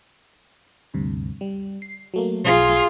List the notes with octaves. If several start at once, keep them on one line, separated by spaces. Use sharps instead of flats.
D2 G2 C3
G3
C7
F#3 A3 A#3
B1 F4 G#4